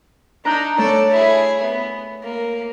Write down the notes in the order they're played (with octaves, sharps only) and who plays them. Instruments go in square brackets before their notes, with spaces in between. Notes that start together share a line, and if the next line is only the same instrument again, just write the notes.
[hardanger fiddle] D4 D#4 [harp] A#5 F#6 G6
[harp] A3 C#5 [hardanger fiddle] A4 D5
[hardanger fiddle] E4 G#4
B3
A#3